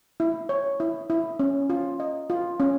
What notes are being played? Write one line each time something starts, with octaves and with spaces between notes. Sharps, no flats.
E4
C#5
E4
E4
C#4
F4
D#5
F4
C#4